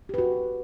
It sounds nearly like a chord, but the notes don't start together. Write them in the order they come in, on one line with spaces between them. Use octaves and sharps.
G4 B4 F#4